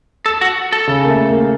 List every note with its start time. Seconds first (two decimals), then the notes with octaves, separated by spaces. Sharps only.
0.26 A4
0.41 F#4
0.73 A4
0.88 C#3
1.05 A#3
1.09 A3
1.29 A#3